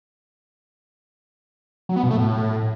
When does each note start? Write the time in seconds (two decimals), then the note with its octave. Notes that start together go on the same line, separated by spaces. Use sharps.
1.89 F#3
1.96 B3
2.03 B2
2.11 A3
2.18 A2